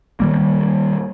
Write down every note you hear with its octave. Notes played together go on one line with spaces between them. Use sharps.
D#3 G3 A#3